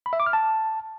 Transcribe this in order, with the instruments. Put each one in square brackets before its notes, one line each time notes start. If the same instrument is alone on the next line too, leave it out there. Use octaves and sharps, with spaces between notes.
[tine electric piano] B5
E5
D6
F6
A5